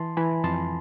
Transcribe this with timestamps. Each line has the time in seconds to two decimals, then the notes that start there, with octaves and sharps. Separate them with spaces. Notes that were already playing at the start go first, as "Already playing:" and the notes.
Already playing: E3 A5 C6
0.17 E3 G#5 B5
0.44 F2 A5 C6